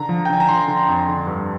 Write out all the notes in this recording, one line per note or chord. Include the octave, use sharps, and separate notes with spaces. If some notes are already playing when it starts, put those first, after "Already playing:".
Already playing: D3 A#5
F3
G5
D3 G#5
A#5
F3 C6
D3
F2
D3
G2